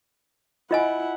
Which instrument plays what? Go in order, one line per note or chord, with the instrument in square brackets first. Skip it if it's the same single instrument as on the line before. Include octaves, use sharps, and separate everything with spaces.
[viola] E4 F#5 [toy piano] F4 D#5 G#5